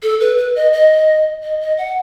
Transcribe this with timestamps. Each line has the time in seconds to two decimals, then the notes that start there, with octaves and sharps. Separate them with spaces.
0.03 A4
0.20 B4
0.38 B4
0.56 D#5
0.73 D#5
1.43 D#5
1.61 D#5
1.78 F#5